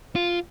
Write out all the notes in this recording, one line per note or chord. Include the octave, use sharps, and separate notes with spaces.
F4